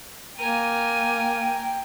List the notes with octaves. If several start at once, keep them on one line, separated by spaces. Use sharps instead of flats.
A#3 A#4 G5 G#5 D#7